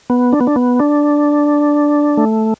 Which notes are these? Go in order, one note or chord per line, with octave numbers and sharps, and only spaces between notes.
B3
D4
B3
D4
B3
D4
A3